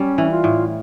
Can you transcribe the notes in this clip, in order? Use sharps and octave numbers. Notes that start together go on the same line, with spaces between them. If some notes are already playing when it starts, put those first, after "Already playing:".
Already playing: G3 C#4
E3
F4
A2